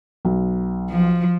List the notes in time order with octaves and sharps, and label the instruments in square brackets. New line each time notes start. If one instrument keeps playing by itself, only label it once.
[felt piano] B1
[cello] F3